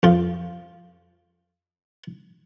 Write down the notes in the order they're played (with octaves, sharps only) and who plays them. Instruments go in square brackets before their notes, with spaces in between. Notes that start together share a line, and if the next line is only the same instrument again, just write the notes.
[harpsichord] F2 F4